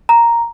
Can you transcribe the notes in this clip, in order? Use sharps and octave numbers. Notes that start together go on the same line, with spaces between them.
A#5